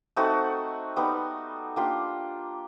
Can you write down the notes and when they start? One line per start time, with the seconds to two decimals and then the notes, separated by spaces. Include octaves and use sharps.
0.16 A3 C4 D#4 F#4
0.96 G3 B3 D#4
1.76 A#3 D4 F4 G4